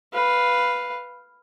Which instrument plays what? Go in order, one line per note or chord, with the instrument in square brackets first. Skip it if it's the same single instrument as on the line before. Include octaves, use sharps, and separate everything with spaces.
[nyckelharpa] B4 F5